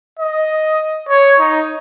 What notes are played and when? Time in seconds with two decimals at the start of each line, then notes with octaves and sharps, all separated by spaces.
0.19 D#5
1.09 C#5
1.39 D#4